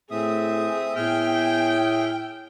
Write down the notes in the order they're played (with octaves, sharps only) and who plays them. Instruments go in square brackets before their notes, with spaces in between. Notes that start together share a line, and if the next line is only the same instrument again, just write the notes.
[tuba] A2 [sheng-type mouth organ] C4 E5 D#6 [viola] G#4
[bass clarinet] A2 [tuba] B3 [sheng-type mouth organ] G#4 E5 F6 [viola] G5